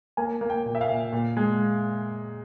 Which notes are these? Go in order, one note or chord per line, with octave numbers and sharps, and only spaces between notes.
A#3 G#5
A#3
G5
A#2
E5
F5
A#2
A#2
G#3